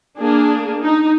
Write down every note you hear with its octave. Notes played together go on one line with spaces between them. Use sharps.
A#3 D4 G#4
D#4